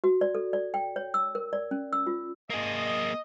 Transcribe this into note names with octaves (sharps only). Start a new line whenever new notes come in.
F#4
D5
A4
D5
G5
C#5
E6
A#4
D5
C#4
E6
F4
A#3 G#4 D#5